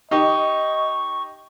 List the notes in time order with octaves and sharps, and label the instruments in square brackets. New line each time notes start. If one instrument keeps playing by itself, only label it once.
[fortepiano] D#4 G4 [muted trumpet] D#5 [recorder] C#6